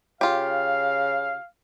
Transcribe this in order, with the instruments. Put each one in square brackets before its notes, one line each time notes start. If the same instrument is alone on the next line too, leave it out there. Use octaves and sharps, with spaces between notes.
[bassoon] C#3 [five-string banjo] F4 G4 [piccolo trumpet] F5